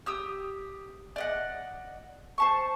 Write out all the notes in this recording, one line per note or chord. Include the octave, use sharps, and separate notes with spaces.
G4 D#6 E6
D5 D#5 F#5
C5 A5 C#6